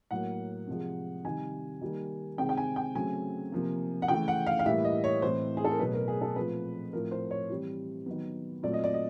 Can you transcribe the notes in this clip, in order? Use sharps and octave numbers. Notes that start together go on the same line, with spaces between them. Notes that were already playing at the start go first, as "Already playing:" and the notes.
A2 F#3 A#3 F#5
C3 F3 G#3
C3 D#3 G3 G#5
D#3 G3 A#3
C3 D#3 G#3 C4 G5
G5
G#5
G5
C#3 F#3 A3 C4 G#5
C3 F3 A#3
F#5
C#3 E3 A3 G5
F#5
F5
F5
A2 E3 G3 A#3 E5
D#5
C#5
A2 E3 A3 C4 C5
G#4
A4
A#4
B2 F#3 A3 B4
A#4
G#4
A4
A#2 F3 A3 C4 B4
A2 F3 A3 C4 A#4
C5
C#5
E3 G3 C4
D#3 F#3 B3
A#2 F#3 A3 C4 D5
D#5
D5
D#5